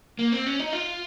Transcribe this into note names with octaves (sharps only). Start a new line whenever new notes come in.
A#3
C4
C#4
D#4
F4